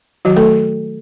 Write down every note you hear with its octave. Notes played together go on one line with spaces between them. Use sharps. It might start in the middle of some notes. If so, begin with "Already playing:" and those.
D#3 F#3 F#4
A3 A4